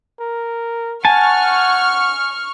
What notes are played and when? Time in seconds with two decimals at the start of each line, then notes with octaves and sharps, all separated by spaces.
0.20 A#4
1.05 F#5 G#5 A5 C#6 F6